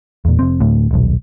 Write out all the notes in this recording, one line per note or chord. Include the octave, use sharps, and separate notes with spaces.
E2 A#2
F1 C4
D2 A2
D#1 B1